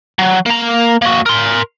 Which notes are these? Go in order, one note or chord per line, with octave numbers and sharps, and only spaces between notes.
F#3
A#3 A#5
A#3 F#4
A#4 C6